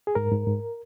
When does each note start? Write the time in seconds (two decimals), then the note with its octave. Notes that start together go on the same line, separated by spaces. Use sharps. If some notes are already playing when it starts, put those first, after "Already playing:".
0.07 G#4
0.15 G#2 A#4
0.32 G#2
0.47 G#2